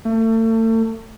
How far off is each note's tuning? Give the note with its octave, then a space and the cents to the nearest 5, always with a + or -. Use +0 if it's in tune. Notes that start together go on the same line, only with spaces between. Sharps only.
A3 +35